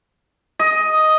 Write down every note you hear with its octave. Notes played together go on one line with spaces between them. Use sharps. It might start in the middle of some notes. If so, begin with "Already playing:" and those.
D#5